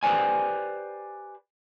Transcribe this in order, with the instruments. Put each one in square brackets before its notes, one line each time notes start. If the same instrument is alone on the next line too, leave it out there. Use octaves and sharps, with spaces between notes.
[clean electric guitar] G4 B4 C5 D5 G#5